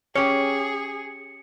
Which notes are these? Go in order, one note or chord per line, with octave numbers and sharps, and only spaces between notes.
C#4 G4 G#4 C#5 C#7